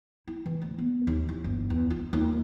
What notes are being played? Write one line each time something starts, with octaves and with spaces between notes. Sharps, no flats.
E4
E3
D2
B3
D#2
E3
G1
E2
F4
D#2